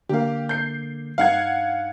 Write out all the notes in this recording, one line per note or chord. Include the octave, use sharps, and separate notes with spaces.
D3 A#3 G4 F5
G6 C7
G2 D#4 F5 F#5 G#6